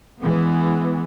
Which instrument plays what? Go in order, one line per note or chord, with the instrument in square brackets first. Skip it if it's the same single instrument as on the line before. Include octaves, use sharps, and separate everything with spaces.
[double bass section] E3 G#3 B3